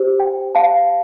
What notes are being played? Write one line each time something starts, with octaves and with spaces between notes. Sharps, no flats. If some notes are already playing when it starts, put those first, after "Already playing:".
Already playing: G4 C5
G5
F5 A5